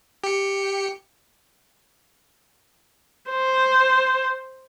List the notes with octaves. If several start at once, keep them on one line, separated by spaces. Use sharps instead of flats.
G4 C#7
C5